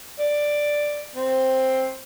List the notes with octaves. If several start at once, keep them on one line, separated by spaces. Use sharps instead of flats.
D5
C4